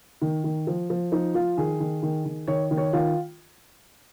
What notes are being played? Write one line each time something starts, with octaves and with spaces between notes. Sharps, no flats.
D#3
D#3
F3
F3
F3 D#4
F3 F4
D#3 G#4
D#3
D#3
D#3
D#3 C#5
D#3
C#5
D#3 F4